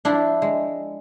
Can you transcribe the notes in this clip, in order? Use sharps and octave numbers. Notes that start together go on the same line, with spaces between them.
F3 D4 E4
G#3